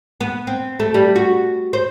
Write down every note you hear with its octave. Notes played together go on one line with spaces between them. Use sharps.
B3
C4
A3
G3
F#4
C5